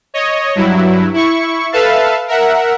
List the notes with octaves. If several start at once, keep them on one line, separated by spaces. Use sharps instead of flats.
C#5 D#5
G2 F#3 E4
E4 C#6
A4 B4 E5 F5 A5
A#4 E5 F#5